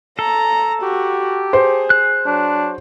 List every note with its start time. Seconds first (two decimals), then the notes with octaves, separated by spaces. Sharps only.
0.19 A4 A#5
0.82 F#4 G4
1.53 G#4 C5
1.90 F#6
2.26 F#3 D4